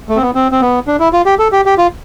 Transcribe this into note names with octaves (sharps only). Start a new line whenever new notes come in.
A3
C4
B3
C4
C4
B3
D4
E4
F4
G4
A4
G4
G4
F4